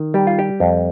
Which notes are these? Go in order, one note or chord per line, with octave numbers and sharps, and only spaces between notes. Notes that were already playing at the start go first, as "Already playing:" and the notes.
Already playing: D#3
G3 G4
F4
G4
F2